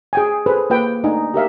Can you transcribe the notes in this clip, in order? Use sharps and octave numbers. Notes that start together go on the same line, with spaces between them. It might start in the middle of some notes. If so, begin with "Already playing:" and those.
G#4 G5 G#5
G#4 A4 B4 C5
A#3 F4 B4 G5
A3 D4 D#4 D#5 F#5 G#5
G4 A#4 E5 F5